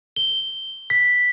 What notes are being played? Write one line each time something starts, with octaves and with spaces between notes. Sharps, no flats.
G7
B6